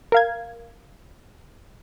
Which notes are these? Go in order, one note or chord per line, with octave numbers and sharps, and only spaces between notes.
A#4 F5 G#6